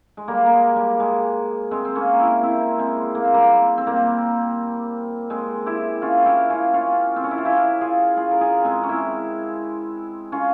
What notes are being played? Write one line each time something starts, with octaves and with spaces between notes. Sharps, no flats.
G#3
G3 A#3
A#3
G#3
G3
G#3
G#3 C4
C4
A#3 C#4
C4 E4
C4 E4
G#3 C4
A#3
C4
G3 A#3
C4
G3 A#3
G#3 C4
E4 G4
C#4 F4
E4 G4
C#4 F4
C#4 F4
C4
C#4
E4
F4
E4 G4
F4 G#4
F4 G#4
A#4
F4 G#4
G#3 C4
C#4
C4 E4
C#4 F4